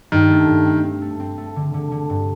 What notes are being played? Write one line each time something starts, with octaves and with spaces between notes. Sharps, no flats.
G2 D#3
A3
G2
C4
C4
A3
C4
A3
D3
D3
D3
G2